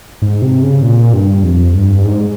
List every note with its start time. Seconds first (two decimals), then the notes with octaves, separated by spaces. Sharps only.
0.22 G#2
0.42 C3
0.63 C#3
0.82 A#2
1.13 G2
1.43 F2
1.74 G2
2.04 G#2